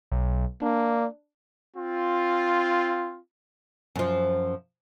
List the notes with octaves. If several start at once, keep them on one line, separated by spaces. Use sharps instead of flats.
B1
A#3 D4
C4 F4
F#2 F3